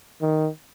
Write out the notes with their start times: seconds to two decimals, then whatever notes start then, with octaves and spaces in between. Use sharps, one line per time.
0.22 D#3